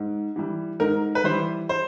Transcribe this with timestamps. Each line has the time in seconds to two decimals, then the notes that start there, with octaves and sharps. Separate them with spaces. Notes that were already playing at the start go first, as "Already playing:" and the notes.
Already playing: G#2
0.36 E3 G3
0.80 G#2 A#4
1.15 B4
1.24 E3 G3 C5
1.69 C5